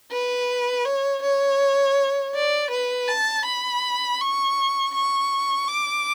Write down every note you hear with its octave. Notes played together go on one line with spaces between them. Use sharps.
B4
C#5
C#5
D5
B4
A5
B5
C#6
C#6
D6